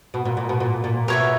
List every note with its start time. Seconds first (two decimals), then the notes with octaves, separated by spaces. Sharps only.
0.14 B2
0.25 A#2
0.37 A#2
0.49 B2
0.60 A#2
0.84 A#2
1.08 B2 A#4 C#5 E5